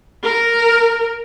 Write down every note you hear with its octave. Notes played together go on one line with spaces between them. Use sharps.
A#4